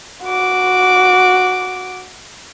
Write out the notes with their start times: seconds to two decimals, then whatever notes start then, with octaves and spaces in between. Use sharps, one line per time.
0.24 F#4 D6